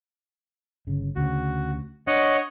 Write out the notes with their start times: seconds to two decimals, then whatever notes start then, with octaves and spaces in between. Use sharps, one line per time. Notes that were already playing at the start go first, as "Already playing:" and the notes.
0.87 G1 C#3
1.16 D2 C#3 F#4
2.07 D4 C#5 D#5 F#5